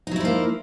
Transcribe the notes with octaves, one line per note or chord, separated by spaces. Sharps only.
F3 F#3 A#3 D#4 E4